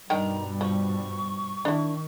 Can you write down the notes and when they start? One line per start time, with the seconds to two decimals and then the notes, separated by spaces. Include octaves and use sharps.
0.10 G2 B2 D#3 G3 D4 G5 A#5
0.61 F3 C#6
1.65 D#3 D4 E4